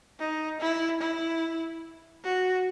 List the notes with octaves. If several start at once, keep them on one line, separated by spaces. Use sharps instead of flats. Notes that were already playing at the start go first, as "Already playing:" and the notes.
D#4
E4
E4
F#4